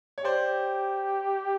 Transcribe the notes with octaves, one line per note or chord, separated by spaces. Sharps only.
C#5
G4 C5 D5